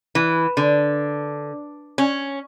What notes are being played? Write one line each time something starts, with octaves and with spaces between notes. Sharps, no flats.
E3
D3
C#4